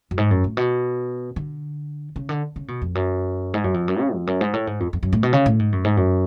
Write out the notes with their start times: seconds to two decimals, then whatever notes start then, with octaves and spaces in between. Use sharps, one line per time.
0.11 F#2
0.18 G#2
0.31 F#2
0.44 A2
0.57 B2
1.36 D3
2.16 C#3
2.29 D3
2.56 C#3
2.68 B2
2.82 F2
2.95 F#2
3.54 G#2
3.64 F#2
3.74 F2
3.88 F#2
4.00 C#3
4.14 F2
4.27 F#2
4.41 G#2
4.54 A2
4.67 G#2
4.80 F2
4.93 F2
5.03 F#2
5.13 A2
5.23 B2
5.33 C#3
5.46 A2
5.59 G#2
5.72 F#2
5.84 G#2
5.97 F#2